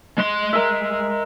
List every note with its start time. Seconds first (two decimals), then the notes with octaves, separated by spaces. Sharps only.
0.18 G#3 C6
0.53 A#4 E5